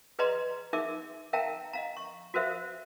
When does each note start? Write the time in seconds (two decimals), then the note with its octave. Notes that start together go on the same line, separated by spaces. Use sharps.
0.19 G#4 B4 D5 D#5 A#5 C6
0.73 D#4 G#4 A#4 E5 D6
1.33 A#4 E5 F5 G5 A5 A#5
1.73 D#5 F5 A#5
1.97 C#6
2.34 F#4 A4 A#4 C5 E5 F5